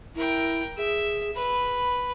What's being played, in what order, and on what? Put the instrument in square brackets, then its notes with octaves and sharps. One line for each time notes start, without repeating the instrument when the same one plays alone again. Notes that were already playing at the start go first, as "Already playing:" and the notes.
[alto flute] E4 [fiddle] A#4 G5
[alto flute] G#4 [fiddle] E5
[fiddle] B4 [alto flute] B5